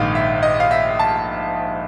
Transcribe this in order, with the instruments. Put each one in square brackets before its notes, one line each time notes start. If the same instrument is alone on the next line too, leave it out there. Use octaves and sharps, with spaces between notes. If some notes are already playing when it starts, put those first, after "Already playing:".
Already playing: [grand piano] A#1 G#2 D#3 F5
E5
D#5
F5
E5
A5